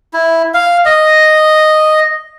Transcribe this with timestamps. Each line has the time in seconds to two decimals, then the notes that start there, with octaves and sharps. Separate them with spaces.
0.13 E4
0.54 F5
0.85 D#5